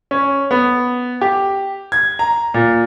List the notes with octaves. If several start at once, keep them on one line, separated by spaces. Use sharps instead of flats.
C#4
B3
G4
G#6
A#5
A#2